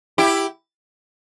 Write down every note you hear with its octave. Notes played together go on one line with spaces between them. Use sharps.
E4 G4